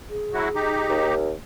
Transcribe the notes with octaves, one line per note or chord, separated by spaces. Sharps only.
G#4
F#3 E4 F#4
D#4 G4
D#2